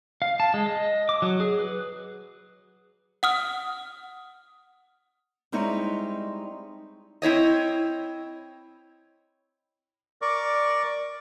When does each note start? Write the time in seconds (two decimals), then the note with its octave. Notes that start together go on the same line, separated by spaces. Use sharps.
0.22 F5
0.40 A5
0.54 G#3
0.66 D#5
1.09 D6
1.22 F#3
1.40 G#4
1.59 B4
3.23 F#5 D#6 F6
5.52 G3 G#3 C4 D#4 E4 C#5
7.22 C4 E4 C#5 D#5
10.22 A#4 D5 C#6 D6